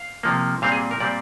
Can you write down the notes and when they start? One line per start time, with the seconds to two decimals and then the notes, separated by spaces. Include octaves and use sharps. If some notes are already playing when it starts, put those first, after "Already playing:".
Already playing: F5
0.23 C3 F3 A#3
0.62 A#2 G3 C4 F5
0.72 G#4
0.91 A#4
1.00 A#2 G3 C4 D5